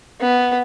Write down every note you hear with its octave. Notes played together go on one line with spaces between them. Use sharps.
B3